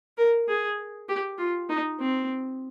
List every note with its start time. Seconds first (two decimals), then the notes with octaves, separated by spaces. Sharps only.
0.18 A#4
0.49 G#4
1.09 G4
1.38 F4
1.69 D#4
2.00 C4